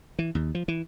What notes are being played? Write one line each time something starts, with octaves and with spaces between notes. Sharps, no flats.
E3
D#2
F3
E3